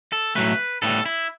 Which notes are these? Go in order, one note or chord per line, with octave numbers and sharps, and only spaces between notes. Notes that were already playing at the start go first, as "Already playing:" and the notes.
A4
A2 F#3 A3 B4
A2 G3 B3 A4
E4